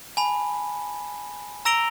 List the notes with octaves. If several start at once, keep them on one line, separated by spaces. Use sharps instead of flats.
G#5 A5 B5
A#5 E6 A#6 D7 F7 G7